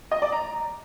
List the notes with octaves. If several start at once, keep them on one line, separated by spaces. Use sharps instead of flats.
D#5
D5
A#5